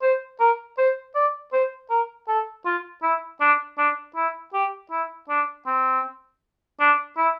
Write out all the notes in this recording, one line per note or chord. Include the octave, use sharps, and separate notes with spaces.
C5
A#4
C5
D5
C5
A#4
A4
F4
E4
D4
D4
E4
G4
E4
D4
C4
D4
E4